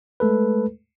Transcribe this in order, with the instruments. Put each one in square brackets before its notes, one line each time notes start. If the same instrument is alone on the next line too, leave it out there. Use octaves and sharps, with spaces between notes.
[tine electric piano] G#3 A3 A4 B4